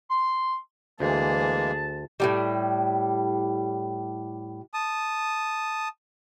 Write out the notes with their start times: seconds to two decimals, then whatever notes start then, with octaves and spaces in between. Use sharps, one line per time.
0.10 C6
1.00 D2 E3 G#3 A#3 G#4 A5
2.20 A2 D3 G3
4.74 A5 D#6